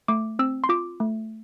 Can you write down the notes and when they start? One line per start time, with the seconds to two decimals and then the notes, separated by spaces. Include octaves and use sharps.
0.08 A3 D6
0.39 C4 E6
0.64 C6
0.69 F4 D6
1.00 A3